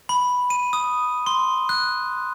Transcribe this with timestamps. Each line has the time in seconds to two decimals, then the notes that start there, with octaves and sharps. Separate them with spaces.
0.09 B5
0.50 D#7
0.73 D#6
1.26 C6
1.69 F#6